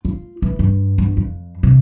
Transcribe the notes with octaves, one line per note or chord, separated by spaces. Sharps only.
F4
E3
G2
G1
F2
C3